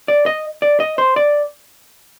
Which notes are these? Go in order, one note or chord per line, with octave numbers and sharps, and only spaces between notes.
D5
D#5
D5
D#5
C5
D5